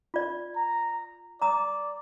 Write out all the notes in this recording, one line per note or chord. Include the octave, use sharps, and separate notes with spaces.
F4 D5
A#5
D5 A#5 D#6